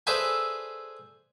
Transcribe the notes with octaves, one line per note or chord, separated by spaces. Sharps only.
G#4 A4 B4 C5 D5 E5